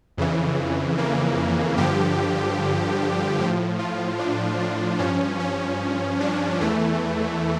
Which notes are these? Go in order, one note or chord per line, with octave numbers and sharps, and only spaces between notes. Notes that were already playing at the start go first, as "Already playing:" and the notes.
F2 C#3 E3
A#3
G2 D3 F3 G4
A2 F3
F4
D4
D4
G2 F3 C#4
C#4
D4
E2 E3 A3